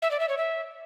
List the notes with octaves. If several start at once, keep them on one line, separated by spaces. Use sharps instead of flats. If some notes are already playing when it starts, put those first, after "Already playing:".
E5
D5
E5
C#5
E5